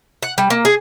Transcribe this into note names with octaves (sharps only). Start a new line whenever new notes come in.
F#5
G3
A#3
G#4